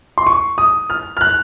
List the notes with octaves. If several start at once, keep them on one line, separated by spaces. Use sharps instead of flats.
C6
C#6
D#6
F6
F6
F#6